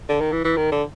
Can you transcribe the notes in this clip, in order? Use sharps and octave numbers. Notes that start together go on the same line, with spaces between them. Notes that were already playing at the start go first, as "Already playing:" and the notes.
D3
D#3
E3
E3
D#3
D3